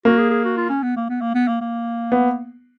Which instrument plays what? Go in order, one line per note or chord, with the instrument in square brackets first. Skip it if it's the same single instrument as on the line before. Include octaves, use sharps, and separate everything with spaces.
[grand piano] A#3 [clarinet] F#4
[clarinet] G#4
G#4
F#4
F4
C#4
B3
A#3
B3
A#3
B3
A#3
A#3
[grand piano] B3